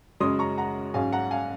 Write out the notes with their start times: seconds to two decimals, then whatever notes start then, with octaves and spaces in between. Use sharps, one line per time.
0.20 F#2 C#3 G#3 C#4 C6 D#6
0.39 A#5 C#6
0.58 F#5 A#5
0.94 G#2 F#3 C#4 F5 G#5
1.13 F#5 A#5
1.31 F5 G#5